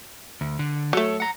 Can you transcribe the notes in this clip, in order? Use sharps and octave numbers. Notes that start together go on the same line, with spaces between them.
D2
D3
F#3 A3 A4 C#5
F#5 A#5